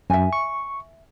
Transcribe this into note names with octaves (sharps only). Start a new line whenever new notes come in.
F#2 E5 G#5
C#6